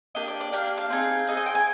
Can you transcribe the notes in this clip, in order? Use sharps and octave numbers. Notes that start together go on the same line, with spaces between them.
A#3 D4 G4 D#5
D5
D5
A#3 D4 G4 F5
F5
C4 D#4 G#4
C4 D#4 G#4 D#5
D#5
G5
G#5